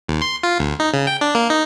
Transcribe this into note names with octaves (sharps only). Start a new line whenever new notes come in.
D#2
C6
F4
D2
D#4
C#3
G5
D4
A#3
D#4